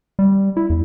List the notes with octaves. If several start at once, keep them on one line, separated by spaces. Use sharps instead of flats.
G3
E4
E2